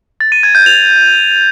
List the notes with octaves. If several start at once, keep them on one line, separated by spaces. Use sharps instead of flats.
A6
D#7
G#6
G6
F7